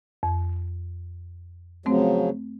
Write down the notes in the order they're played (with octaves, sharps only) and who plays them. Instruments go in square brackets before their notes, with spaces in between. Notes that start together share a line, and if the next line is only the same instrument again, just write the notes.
[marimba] F2
[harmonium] C#3 F3 F#3 [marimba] A3 C4